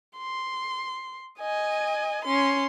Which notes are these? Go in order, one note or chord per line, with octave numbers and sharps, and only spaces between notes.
C6
D#5 G#5
C#4 C6